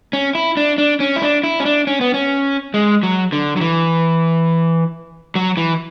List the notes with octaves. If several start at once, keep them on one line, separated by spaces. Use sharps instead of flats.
C#4
E4
D4
D4
C#4
E4
D4
E4
C#4
D4
C#4
B3
C#4
G#3
F#3
D3
F#3
E3
F#3
E3